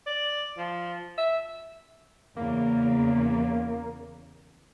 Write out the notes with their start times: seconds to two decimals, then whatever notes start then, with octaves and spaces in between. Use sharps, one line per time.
0.07 D5
0.58 F3
1.18 E5
2.37 E2 C#3 A#3